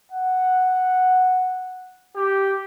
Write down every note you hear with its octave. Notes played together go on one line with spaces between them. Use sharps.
F#5
G4